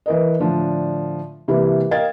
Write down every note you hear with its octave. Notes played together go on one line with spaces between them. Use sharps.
E3 A#4 D#5
A2 D3 F3 D4
C3 E3 G3 A#3 E4
A#4 D#5 F5 G5 G#6 A6